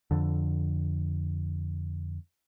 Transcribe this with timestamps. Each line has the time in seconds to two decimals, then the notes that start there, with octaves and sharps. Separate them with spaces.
0.11 F2 D3